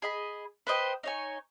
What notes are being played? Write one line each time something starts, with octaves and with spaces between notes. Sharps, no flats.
G#4 D#5 B5
B4 C5 D#5 G5
D#4 C#5 G#5